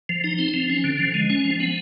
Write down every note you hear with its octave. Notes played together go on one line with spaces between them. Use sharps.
F3
D#4
C4
F3
C#4
D3
F3
G#3
C#4
F3
B3